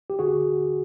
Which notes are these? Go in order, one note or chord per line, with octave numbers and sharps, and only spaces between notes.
G4
D3 F#4 G#4